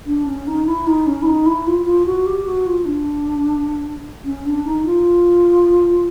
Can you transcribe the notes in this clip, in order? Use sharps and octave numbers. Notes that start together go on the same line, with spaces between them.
D4
C#4
D#4
E4
D#4
C#4
E4
D#4
E4
F4
F4
F#4
G4
F#4
F4
D4
C#4
D4
D#4
F4